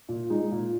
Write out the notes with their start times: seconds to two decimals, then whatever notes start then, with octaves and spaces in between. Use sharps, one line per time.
0.08 A#2
0.30 G#3 D#4
0.52 A#2